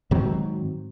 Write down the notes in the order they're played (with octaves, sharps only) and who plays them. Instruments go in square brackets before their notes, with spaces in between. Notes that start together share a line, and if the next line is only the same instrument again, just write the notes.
[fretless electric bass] G#2 D#3 F#3 C4